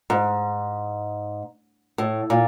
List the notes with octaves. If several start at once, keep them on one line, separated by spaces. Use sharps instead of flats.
G#2
A2
A#2